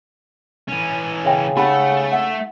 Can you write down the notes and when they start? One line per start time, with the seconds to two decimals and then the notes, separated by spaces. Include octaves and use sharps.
0.68 E3 C#4
1.25 C#3 C#5 E5 G5
1.56 A3 D#4 G4 F#5 B5
2.12 E5 F#5